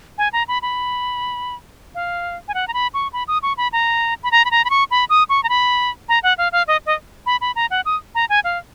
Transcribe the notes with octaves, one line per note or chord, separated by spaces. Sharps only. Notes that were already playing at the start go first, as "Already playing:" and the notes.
G#5
A#5
B5
B5
F5
G#5
F#5
A#5
B5
C#6
B5
D#6
C#6
B5
A#5
B5
A#5
B5
A#5
B5
C#6
B5
D#6
C#6
A#5
B5
A#5
F#5
F5
F5
D#5
D#5
B5
B5
A#5
F#5
D#6
A#5
G#5
F5